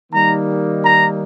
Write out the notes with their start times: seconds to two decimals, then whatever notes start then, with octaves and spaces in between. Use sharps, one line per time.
0.13 D#3 G3 A#3 D#4 A#5
0.83 A#5